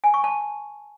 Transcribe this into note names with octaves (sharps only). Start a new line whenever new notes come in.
G#5
C#6
A5